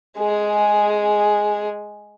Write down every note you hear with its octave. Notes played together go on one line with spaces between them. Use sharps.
G#3 G#4